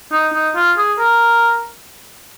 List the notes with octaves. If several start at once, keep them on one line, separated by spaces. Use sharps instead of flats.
D#4
D#4
F4
G#4
A#4